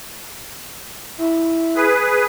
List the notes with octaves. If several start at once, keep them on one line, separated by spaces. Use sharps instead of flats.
E4
G#4 B4